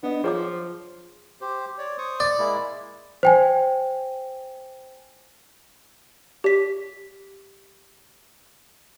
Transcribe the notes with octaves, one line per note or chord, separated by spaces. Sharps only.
B3 D4 D#5
F3 F4 G#4 C5 C#5 D6
G4 C5
C#5 D5
C5 C#6 D#6
D5
G#3 A#3 E4
C5 G5 G#5
G4 B6